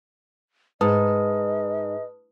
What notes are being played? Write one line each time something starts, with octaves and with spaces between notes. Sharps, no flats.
G#2 B4 D#5 A5 D#6